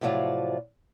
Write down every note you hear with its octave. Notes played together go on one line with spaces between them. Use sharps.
A2 C3 F3 F#3 F4 D5